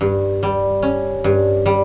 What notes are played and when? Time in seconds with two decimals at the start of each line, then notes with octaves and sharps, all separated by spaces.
0.01 G2
0.43 G3
0.82 C#4
1.24 G2
1.66 G3